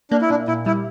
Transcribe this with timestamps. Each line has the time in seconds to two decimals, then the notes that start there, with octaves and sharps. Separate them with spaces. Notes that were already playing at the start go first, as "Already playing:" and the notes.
0.11 A#3 D4
0.22 E4
0.30 A#2 D4
0.48 A#2 E4
0.66 G3 E4